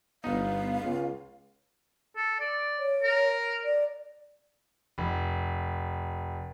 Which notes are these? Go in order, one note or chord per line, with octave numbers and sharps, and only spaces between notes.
G1 B3 D#4 F5
C#2
A4
D5
C#5
A#4
D5
F1